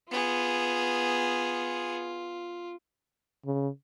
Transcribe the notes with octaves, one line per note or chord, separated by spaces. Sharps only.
B3 F4 G#4
C#3